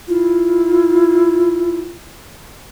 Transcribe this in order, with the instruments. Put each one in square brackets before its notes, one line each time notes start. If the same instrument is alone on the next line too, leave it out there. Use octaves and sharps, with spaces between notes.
[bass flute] E4 [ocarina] F4